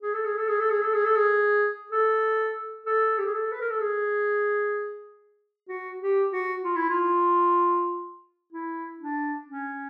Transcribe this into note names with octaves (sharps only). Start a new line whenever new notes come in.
G#4
A4
G#4
A4
G#4
A4
G#4
A4
G#4
A4
G#4
A4
A4
G4
G#4
A4
B4
A#4
A4
G#4
F#4
G4
F#4
F4
E4
F4
E4
D4
C#4